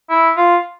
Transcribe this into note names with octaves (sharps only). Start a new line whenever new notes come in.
E4
F4